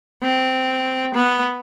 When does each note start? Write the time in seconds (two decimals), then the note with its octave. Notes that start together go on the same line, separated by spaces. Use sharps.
0.23 C4
1.14 B3